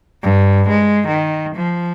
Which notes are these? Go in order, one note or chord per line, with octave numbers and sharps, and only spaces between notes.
G2
G#3
D#3
F3